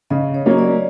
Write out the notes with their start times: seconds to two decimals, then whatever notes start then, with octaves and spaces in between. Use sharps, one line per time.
0.10 C#3 D#5
0.34 C#5
0.46 F#3 A#3 C#4 C#5
0.58 D5